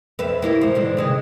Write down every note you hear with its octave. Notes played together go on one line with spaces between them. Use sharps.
F2 B4 E5
A#3 E4 G4
G#2 F3
G#2 D3 E3
C3 D#3 G#3